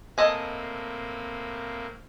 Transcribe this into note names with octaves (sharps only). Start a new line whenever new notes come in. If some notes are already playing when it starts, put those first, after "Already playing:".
A2 A#3 C4 A4 D#5 G#5